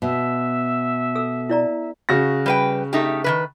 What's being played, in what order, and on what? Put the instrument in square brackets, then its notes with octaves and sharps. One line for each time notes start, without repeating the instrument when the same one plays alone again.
[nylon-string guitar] B2 [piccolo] E5
[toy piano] A4 E6
E4 D5 A#5
[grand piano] C#3 F#4 A#6
[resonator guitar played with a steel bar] G3 B4 G5
A3 D#4 G4
D#3 E3 B4